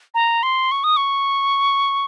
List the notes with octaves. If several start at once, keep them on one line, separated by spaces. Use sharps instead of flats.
A#5
C6
C#6
D#6
C#6